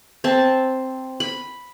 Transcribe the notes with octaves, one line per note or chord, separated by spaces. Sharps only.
C4 A5
B5